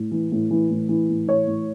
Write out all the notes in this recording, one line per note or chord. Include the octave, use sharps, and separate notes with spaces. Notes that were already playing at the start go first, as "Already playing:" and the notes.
Already playing: A2
E3
A2
E3
A2
E3
A2
E3 C#5
A2